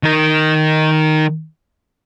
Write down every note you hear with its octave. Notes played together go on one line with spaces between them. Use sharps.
D#3 A#4